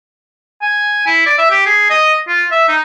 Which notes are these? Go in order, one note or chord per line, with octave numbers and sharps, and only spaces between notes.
G#5
E4
D5
E5
G4
G#4
D#5
F4
E5
D#4